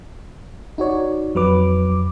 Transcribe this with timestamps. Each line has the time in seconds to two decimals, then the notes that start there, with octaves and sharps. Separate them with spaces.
0.78 D#4 F#4 C#5 D5
1.35 F2 F#3 B4 D6